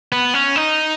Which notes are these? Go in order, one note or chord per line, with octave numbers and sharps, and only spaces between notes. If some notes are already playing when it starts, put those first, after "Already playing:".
B3
C#4
D#4